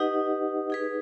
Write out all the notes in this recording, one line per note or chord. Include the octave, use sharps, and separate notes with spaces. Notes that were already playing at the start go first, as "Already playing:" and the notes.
Already playing: D#4 G4 B4 D#5 F#5
D#4 G#4 B4